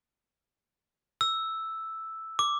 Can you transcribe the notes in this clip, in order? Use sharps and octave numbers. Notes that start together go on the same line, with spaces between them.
E6
D6